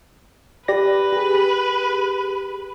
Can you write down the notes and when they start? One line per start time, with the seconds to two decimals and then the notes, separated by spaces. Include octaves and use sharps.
0.68 G4 B4 D5 A#6
1.13 G4 G#4